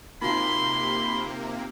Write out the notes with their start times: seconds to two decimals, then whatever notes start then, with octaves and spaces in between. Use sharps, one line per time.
0.21 C3 A#3 D#4 F4 F#4 B5 C6